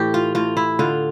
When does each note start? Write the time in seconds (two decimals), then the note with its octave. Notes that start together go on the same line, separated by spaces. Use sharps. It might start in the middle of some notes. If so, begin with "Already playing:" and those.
Already playing: A2 E3 G4
0.14 F4
0.35 A2 F4
0.57 E4
0.79 D3 F4